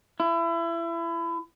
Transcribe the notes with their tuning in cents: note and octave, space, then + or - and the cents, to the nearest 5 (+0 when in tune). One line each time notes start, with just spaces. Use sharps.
E4 +30